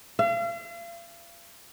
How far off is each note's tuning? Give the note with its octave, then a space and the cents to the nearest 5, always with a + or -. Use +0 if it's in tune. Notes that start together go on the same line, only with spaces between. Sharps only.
F5 -40